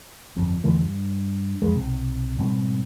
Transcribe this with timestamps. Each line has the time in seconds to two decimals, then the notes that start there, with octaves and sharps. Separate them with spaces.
0.36 G1 F2
0.64 E2 D3 E3 A3
0.82 G2
1.62 F2 G#3
1.75 B1 C3
2.38 G#2 B2 G3 C4